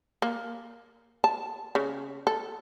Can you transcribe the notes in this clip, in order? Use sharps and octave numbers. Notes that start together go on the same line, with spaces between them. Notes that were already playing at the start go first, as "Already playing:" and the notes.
A#3
A5
C#3
A4